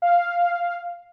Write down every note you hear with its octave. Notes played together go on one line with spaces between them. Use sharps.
F5